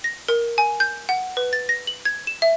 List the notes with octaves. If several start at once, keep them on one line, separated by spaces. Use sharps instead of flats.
A#6
A#4
G#5
G6
F#5
B4
A6
A#6
F#7
G#6
E7
E5